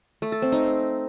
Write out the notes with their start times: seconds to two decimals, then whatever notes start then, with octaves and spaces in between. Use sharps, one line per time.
0.22 A3
0.32 A4
0.42 C4
0.52 D#4